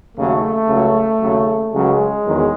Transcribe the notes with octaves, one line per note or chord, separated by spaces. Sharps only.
D#2 C#3 F#3 A3
C#2 C#3 F#3
D#2 C#3 F#3
C#2 C#3 F#3 G#3
E2 D#3 F#3